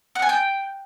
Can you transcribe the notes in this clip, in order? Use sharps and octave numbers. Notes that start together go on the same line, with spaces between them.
F#5
G#5
G5